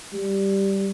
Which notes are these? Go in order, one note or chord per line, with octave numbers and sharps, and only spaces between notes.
G3